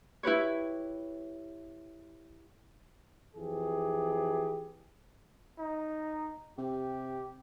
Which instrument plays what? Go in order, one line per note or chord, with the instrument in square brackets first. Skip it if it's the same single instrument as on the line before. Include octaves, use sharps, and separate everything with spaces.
[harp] E4 G4 B4 C#5
[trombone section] F2 E3 G4 G#4
[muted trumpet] D#4
[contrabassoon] C3 [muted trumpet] G4